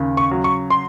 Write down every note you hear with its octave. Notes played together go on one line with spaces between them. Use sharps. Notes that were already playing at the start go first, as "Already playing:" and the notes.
Already playing: D#2 C#3
C#6
F#3
C#6
C6